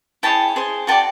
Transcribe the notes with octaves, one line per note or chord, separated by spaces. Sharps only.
E4 G#4 C#5 G5 A5
G#4 C5 D#5
F#4 B4 D5 G5 A5